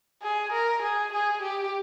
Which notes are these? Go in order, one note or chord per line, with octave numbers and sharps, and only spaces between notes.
G#4
A#4
G#4
G#4
G4